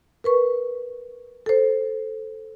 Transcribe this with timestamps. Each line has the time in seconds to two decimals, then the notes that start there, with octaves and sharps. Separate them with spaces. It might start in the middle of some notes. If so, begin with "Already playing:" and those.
0.24 A#4 B4 C#6
1.46 A4 C5